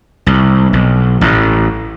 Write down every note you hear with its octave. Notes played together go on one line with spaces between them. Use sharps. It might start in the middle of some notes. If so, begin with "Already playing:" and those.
C2
B1
A1